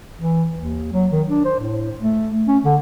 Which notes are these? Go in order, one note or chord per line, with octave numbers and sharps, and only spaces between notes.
E3
D#2
F#3
D#3
D4
C5
A2
A3
C#4
D3